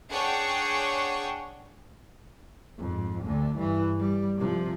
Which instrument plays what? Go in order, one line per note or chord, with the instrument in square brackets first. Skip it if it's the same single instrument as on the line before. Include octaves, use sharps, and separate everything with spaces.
[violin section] D4 G#4 C#5 F#5 G5 C#6
[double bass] F2 G#2
D2 D3
G2 E3
G3
C3 F3